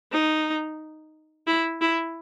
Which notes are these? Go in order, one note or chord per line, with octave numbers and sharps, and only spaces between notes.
D#4
E4
E4